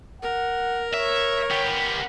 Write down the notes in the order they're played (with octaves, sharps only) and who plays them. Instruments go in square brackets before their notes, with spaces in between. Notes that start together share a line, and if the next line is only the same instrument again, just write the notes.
[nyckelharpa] A#4 [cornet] F#5
[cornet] C#5 [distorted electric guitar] E5
[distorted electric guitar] B3 G4